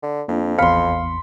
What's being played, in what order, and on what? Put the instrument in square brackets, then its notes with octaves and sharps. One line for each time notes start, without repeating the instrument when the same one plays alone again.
[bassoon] D3
[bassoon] F2 [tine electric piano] A#3 D4 F4
[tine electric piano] A1 E2 C#7 [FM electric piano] F5 [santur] B5 C6